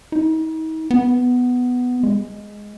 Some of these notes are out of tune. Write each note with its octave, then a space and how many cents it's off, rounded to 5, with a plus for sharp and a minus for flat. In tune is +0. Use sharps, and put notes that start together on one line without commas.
D#4 +40
B3 +5
G#3 +0